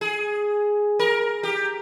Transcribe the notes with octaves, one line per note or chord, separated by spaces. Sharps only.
G#4
A#4
G4